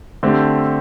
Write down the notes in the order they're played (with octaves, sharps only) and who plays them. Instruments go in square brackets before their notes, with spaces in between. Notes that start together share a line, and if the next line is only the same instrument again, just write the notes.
[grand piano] D3 A3 C4 G4